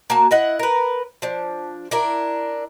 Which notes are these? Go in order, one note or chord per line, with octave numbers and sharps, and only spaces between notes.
A#3 F#4 A5
E4 D#5 F#5
A#4 B4
F3 D4
D4 E4 A#4